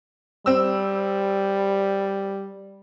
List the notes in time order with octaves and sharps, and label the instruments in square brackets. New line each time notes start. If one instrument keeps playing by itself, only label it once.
[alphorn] G3 [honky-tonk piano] C4 E6